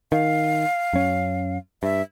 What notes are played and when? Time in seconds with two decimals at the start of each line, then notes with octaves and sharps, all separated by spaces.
0.12 D#3 F5
0.93 F#2 C#4
1.83 G2 E5